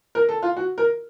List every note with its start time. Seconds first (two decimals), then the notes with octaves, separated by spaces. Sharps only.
0.15 A#4
0.29 A4
0.42 F4
0.57 F#4
0.78 A#4